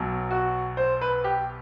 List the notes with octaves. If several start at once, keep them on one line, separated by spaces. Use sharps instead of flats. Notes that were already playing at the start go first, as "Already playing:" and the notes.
Already playing: B1 B2 F#3
F#4
C5
B4
G4